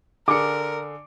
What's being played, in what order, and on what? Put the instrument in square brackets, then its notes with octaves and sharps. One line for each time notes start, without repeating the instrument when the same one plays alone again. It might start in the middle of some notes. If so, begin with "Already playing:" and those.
[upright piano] D3 G#4 C#7 [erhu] A#4 [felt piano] D6